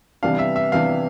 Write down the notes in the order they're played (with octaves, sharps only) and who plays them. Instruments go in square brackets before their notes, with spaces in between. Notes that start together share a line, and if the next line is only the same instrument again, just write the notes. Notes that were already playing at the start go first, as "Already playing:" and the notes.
[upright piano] C3 E3 G3 B3 D4 [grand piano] F5
[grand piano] E5
E5
[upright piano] C3 E3 G3 B3 D4 [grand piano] F5